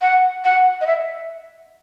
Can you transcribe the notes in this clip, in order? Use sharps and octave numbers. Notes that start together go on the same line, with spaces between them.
F#5
F#5
D#5
E5